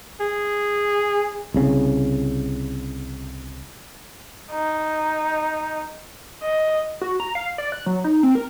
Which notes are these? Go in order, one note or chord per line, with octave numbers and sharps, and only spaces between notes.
G#4
C2 C#3
D#4
D#5
F#4
A#5
F5
D5
F#6
F#3
D#4
C4
A#4